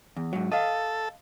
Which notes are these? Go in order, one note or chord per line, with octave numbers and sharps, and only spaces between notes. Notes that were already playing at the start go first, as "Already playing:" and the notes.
E2
G#2 F#3
A4 D#5 F5